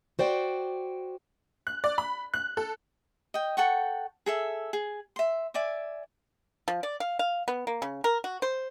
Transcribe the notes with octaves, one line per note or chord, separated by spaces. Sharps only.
F#4 C5 D5 G5
F#6
D5
B5
F#6
A4
D#5 G5
A4 F#5 G5 C#6
G#4 A4 E5
G#4
E5 C6
D5 E5 G#5 D6
F3
D5
F5
F5
B3
A#3
C#3
A#4
F#4
C5